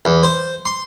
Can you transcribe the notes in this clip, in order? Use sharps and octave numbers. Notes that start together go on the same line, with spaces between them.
E2
C5
C6